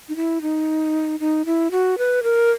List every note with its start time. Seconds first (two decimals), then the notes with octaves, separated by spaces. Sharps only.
0.09 D#4
0.16 E4
0.42 D#4
1.20 D#4
1.46 E4
1.71 F#4
1.98 B4
2.23 A#4